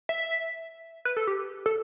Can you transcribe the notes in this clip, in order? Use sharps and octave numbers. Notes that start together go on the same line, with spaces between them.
E5
B4
A4
G4
A4